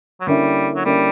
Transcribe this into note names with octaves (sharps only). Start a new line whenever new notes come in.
F#3
D3 G3 A#3 C#4 E4
F#3
D3 G3 A#3 C#4 E4